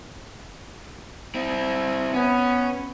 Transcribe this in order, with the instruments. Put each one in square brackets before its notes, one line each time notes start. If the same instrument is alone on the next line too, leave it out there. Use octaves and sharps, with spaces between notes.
[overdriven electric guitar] C4 E4
[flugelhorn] B3 [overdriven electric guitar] C#4